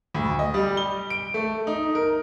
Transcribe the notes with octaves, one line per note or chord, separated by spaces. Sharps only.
D2
D#5
G3
G7
D7
A3
D#4
A#4